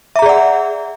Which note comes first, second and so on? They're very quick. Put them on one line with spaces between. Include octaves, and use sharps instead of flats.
E5 A#5 G#4 D5 F#5